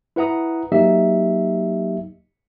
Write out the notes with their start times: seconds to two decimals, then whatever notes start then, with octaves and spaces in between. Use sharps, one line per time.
0.16 E4 B4 F#5 A#5 D#6
0.72 F#3 A#3 D#4 G4 D#5 E5